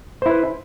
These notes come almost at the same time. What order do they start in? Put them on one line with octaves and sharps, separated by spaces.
C5 E4 B4